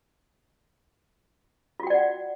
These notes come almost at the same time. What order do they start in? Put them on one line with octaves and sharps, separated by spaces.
F4 F#4 G5 D5 F#5